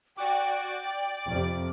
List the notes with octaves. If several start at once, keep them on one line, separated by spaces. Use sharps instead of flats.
F#4 D5 G5 D6
D5
F2 C3